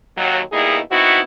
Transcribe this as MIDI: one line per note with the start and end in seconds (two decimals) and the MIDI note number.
0.17 0.40 39
0.17 0.40 54
0.52 0.78 47
0.52 0.78 55
0.52 0.78 58
0.52 0.78 63
0.52 0.78 64
0.52 0.78 68
0.90 1.19 59
0.90 1.19 60
0.90 1.19 63
0.90 1.19 64
0.90 1.19 66